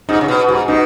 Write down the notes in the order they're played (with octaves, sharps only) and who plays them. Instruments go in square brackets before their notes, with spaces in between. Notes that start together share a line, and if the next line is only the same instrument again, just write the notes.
[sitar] G#2 [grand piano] D#4
[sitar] C#3
B2
[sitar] G#2 [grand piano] F#4
[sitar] B2 [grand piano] D#4